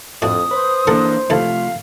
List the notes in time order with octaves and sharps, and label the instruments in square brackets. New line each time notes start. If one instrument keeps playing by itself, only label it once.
[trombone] F2 [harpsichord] A2 D4 F#4 [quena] D#6
[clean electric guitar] B4 [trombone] C5
[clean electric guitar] E3 A#3 D4 [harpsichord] A4 A#4 F#5
[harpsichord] D#2 E4 A4 [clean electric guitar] C3 F3 A3 [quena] F5